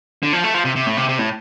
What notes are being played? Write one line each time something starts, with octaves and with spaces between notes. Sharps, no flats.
D3
F3
A3
F3
C3
C3
A2
C3
C3
A2